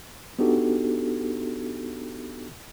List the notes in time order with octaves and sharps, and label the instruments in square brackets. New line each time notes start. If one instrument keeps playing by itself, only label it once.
[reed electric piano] B3 D4 D#4 F#4 G4 A4